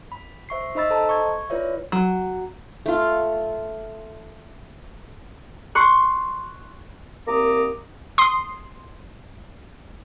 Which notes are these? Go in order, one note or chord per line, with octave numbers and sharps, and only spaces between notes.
B5
C5 E5 C#6 C7
D#4 C5 D#5 B5 E6 A6
A4 C5 D#5 A5 A#5 C6
C#6 G#6
E4 F4 B4 C#5 D5 E5
F#3
A3 F4
C6 C#6 F#6
C2 A#3 C4 A#5 D6 D#6
C6 D#6 C7